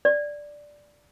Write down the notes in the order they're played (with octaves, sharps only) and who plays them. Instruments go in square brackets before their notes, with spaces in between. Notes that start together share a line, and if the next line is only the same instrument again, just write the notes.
[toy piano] D5